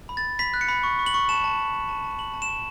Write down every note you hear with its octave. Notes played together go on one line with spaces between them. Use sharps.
B5
A6
B5
B5 B6
F#6
C#7
B5
C#6
C#6
F#7
C#6
A5 E7
A5
A5
A5
A5
A5
A5 F#7
A5
E7
C#6